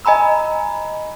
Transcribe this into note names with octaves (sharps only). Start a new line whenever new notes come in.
D#5 G#5 A#5 B5 E6